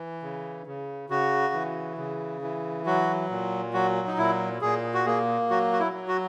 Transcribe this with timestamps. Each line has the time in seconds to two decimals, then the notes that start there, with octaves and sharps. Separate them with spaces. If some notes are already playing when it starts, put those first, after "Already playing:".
Already playing: E3
0.23 C#3
0.67 C#3
1.10 C#3 F#4
1.54 E3
1.98 C#3
2.42 E3
2.86 F#3 F#4
3.30 A#2
3.74 F#3 F#4
4.08 D#4
4.18 A#2 E4
4.61 A#2 G#4
4.94 F#4
5.06 A#3 G#4
5.50 F#3 F#4
5.72 F#4
5.79 E4
5.93 F#3
6.08 F#4